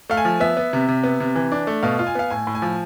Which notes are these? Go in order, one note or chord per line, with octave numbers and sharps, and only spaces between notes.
A3 F5
G#5
F3
B3 E5
B3
C3
C3
B3
C3
E3
D4
A3
B2 F5
F4
G#5
B3 F5
A2 G#5
A2
G#5
F3